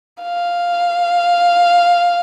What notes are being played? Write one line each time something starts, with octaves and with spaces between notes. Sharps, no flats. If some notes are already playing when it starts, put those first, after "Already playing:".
F5